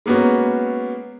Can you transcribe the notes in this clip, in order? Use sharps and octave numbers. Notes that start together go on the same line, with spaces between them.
G#3 A#3 B3 C#4 F#4